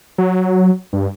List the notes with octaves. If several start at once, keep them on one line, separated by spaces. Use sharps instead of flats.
F#3
G2